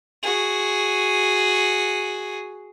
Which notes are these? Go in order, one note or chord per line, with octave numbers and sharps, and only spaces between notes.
F#4 G#4